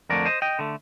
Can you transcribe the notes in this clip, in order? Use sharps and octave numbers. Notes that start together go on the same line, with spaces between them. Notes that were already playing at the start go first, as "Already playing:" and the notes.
F2 D3 A3 A#4 D5
C5 D#5
D#5 G5
D3 A3